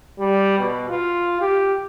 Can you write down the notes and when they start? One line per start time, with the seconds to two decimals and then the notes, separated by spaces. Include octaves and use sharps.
0.19 G3
0.58 B2
0.89 F4
1.41 G4